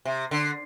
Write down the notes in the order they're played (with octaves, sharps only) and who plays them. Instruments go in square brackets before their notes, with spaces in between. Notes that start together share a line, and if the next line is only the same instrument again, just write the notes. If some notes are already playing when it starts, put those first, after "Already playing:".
[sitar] C3
D3